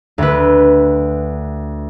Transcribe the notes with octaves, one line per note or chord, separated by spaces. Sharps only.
D2 B4